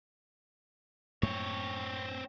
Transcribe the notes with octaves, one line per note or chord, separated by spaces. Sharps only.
F#2 A2 A#3 C4 C#5